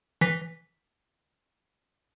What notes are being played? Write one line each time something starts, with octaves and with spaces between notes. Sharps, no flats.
E3 B6